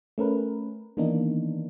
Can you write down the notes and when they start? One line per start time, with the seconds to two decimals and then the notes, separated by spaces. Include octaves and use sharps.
0.18 A3 C#4 A#4 B4
0.97 D#3 E3 A#3 B3 D4 D#4